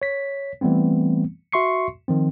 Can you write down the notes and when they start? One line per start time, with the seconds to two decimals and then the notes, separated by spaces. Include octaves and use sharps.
0.02 C#5 B6
0.61 E3 G3 A3 B3 C4
1.52 F#4 E5 C6 C#6 C7 C#7
2.08 D#3 F3 C4